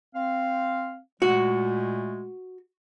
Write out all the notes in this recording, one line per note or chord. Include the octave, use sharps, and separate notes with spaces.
C4 F5
A#2 G#3 A3 F#4